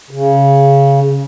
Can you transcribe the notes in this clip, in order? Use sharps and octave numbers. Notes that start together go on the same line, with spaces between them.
C#3